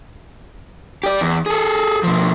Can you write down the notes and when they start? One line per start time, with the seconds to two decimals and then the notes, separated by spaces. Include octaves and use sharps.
1.03 G4 D5
1.21 E2
1.46 G#4 A4
2.03 B2 F3